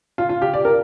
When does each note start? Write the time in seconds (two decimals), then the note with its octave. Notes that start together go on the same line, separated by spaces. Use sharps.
0.18 F4
0.29 F4
0.42 G4
0.54 D5
0.65 A#4